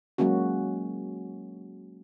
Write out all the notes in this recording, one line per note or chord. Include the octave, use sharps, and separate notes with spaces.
F#3 G#3 A#3 C#4 F#4